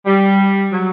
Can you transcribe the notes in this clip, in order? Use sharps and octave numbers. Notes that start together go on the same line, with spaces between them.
G3
F#3